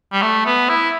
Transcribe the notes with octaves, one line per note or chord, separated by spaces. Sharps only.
G3
A3
B3
E4